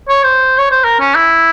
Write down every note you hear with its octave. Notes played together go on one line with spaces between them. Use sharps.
C#5
C5
C#5
C5
A#4
C#4
E4